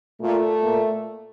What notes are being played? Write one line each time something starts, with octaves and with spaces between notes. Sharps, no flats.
A#2 A3
A#2